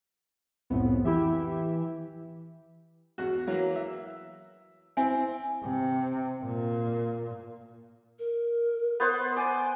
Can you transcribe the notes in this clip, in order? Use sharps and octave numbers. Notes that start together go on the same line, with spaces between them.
C2 F2 A2 B3
E3 E4 G4 E5
E2 F#4
E3 F#3 A#3
E5
C4 E4 G#5
C3
A#2
A#4
B3 C5 F#5
D5 G#5